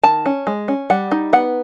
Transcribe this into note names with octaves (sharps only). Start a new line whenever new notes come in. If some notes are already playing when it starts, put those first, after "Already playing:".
D#3 A5
C#4
G#3
C#4
G3 F#5
D#4
B3 F#5